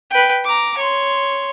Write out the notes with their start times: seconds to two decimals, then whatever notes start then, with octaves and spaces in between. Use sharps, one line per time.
0.11 B4 G5
0.45 A#5 D6
0.78 C#5 C6